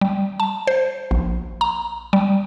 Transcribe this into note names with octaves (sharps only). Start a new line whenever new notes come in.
G3
A5
C5
A#1
A#5
G3